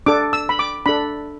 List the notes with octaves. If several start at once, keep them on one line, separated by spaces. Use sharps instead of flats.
D4 A4 D6
E6
B5
D6
D4 A4 B5